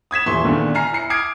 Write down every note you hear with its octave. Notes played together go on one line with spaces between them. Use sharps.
D#6 G#6 B6 E7
D#1 E3 E5 C6 C#6
E2 A#2 D3 D#3
G#5 A#5 F6 C7
E4 A#5 C7 C#7
D6 D#6 F6 G#6 C7 D7